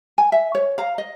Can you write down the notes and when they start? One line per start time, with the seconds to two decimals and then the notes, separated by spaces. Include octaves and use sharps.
0.18 G#5
0.32 E5
0.55 C#5
0.78 F5 A#5
0.98 D#5